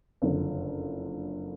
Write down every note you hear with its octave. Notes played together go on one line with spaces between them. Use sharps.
F#1 F2 D3